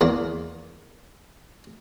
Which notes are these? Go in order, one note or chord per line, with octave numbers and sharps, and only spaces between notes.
E2 A#3